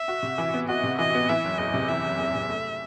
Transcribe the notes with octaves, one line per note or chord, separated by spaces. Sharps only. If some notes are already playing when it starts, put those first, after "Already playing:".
Already playing: E5
F#4
C3
E3
B3
F#4 D#5
C3
E3 D#5
B3
E3 E5
F#1
E2 D#5
C3
E3 E5
F#1
E2
C3
A3